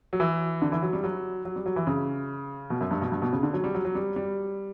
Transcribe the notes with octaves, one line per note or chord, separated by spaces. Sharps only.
F#3
E3
D3
E3
F#3
G3
F#3
F#3
G3
F#3
E3
C#3
B2
F#2
G2
B2
G2
B2
C#3
D3
F#3
G3
F#3
F#3
G3
G3